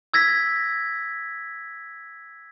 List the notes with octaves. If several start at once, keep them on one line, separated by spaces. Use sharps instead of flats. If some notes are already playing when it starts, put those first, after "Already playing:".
E6 G#6 A#6 B6